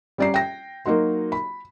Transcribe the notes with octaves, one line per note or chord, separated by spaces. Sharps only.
G3 C#4 D5 A#5 C7
G5 A#6
F#3 A#3 D#4 F#4 C6
B5